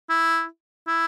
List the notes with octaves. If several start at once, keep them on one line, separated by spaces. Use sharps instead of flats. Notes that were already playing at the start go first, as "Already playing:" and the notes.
E4
E4